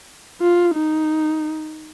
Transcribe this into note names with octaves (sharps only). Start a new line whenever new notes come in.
F4
D#4